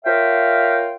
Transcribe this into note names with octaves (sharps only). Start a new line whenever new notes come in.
F4 A#4 C#5 E5 F5 G5